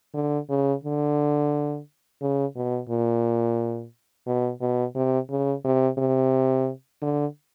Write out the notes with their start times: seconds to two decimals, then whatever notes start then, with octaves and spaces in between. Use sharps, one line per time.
0.14 D3
0.49 C#3
0.83 D3
2.21 C#3
2.56 B2
2.89 A#2
4.26 B2
4.61 B2
4.95 C3
5.30 C#3
5.64 C3
5.98 C3
7.02 D3